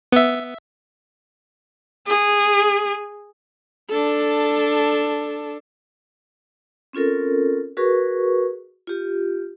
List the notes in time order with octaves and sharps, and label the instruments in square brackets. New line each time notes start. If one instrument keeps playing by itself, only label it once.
[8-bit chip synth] B3 E5
[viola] G#4
D4 A4
[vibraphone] C4 C#4 F4 A4 A#4
F#4 G#4 A#4 B4 C#6
F4 G4